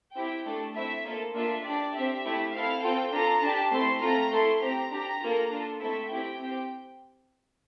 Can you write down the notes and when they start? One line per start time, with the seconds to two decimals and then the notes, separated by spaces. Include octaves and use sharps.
0.16 C4 E4 G4 G5
0.46 A3 D4 A4
0.75 A3 C4 E4 E5
1.05 A#3 F4 A4
1.35 A#3 D4 F4 A4 E5
1.65 D4 G4 D5
1.94 C4 G4 E5
2.25 A3 E4 G4
2.54 C4 E4 A4 F5
2.83 C4 F4 A4 G5
3.13 D4 F4 A4 A#5
3.43 D4 G4 A5
3.72 A3 C4 E4 A4 C6
4.02 A3 C4 F4 A4 A#5
4.32 A3 E4 A4 C6
4.61 C4 G4 A#5
4.91 D4 G4 A#5
5.21 A#3 F4 A4
5.50 D4 F4 A4
5.80 A3 C4 E4 A4 E5
6.09 C4 E4 G4 G5
6.40 C4 G4